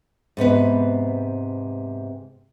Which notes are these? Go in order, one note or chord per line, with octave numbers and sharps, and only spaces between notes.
G#2 C3 B3 B4